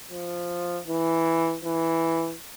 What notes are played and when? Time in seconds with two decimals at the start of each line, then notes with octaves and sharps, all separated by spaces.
0.11 F3
0.88 E3
1.65 E3